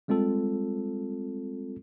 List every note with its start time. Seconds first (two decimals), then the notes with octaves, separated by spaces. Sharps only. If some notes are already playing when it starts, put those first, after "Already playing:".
0.08 G3 G#3 C4 F4 A4